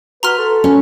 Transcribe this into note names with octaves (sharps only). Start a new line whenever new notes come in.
F#4 B4 A#5 C6 F6
A4
C#4 F#4